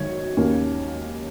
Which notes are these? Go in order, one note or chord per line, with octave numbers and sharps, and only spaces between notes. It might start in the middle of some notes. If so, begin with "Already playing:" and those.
Already playing: G#1 F#2 D#3 C#5
D#2 D#3 A#3 C#4